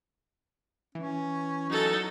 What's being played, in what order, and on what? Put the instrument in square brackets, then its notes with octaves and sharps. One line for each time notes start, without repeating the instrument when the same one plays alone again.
[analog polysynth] E3 [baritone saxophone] C#4
[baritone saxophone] F#3 [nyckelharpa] D#4 A4